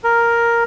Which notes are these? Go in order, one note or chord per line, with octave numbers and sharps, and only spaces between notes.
A#4